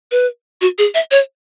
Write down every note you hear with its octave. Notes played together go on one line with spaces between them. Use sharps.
B4
F#4
G#4
E5
C#5